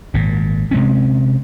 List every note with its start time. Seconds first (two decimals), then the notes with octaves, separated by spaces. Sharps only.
0.14 G#1 A#2
0.71 C3 G#3 C4 C#4